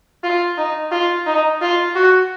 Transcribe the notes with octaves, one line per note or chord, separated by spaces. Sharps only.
F4
D#4
F4
D#4
F4
F#4